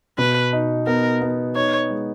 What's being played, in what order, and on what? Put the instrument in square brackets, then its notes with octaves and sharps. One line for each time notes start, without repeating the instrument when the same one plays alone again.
[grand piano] B2 [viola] B4
[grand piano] D#4
[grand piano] B3 [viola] A#4
[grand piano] B3
[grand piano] D#4 [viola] C#5
[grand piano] G#3